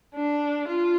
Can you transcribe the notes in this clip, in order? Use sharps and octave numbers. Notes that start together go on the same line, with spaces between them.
D4
F4